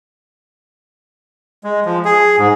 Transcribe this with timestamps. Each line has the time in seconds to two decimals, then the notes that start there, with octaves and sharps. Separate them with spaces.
1.64 G#3
1.85 F3
2.05 G#4
2.39 G#2